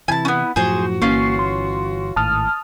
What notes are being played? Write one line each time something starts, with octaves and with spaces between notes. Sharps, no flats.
C3 E3 E4 G#5 A5
B3 C#4
F#2 A2 F3 F#4 G#4 C5
G1 E3 A#3 C#4 F4 C7
C6
G#1 A2 A5 D#6 F6